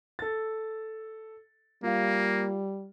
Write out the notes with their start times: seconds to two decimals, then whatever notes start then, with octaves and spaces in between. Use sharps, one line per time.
0.19 A4 A6
1.83 G3 A#3 F4 F5